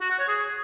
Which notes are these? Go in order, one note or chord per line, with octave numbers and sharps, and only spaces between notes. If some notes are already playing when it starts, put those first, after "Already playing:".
F#4
F#5
C#5
G#4